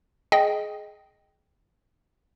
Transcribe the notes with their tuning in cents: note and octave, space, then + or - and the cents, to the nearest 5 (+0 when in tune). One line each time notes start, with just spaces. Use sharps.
G#4 +20 D#5 +0 G5 +0